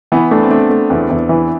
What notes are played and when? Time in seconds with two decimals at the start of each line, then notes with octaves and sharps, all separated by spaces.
0.12 E3 B3
0.31 A3 D4
0.43 C4
0.51 A3 D4
0.70 A3
0.90 E2
1.10 E2
1.29 E3